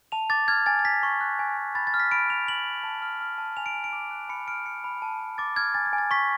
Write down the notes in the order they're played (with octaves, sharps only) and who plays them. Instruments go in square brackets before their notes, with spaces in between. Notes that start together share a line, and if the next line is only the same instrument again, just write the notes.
[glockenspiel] A5 F7
D6 A6
F6 G#6
G#5 A6
A6
G#5 B6
C#6
F#6
G#5
G#5
B5 A6
A6
F6
B6
B5 D7
F6 F7
F6 F#7
B5
A5
F6
F6
A5
G#5 F7
D7
G#5
D7
D6
F#6
B5 C#7
F6 D7
F6 C#7
B5
A5
A5
D6 A6
F6 G#6
G#5 A6
G#6
G#5
A6
C#6 B6